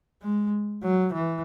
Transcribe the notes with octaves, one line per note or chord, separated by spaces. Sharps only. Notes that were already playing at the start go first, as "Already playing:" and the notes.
G#3
F#3
E3